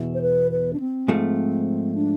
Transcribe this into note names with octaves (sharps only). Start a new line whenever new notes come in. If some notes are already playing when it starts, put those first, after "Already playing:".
Already playing: E2 B2 B3 E4
C5
B4
B4
D4
C4
G#2 F3 A3
D4